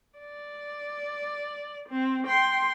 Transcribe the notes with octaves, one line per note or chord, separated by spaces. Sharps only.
D5
C4
G5 C6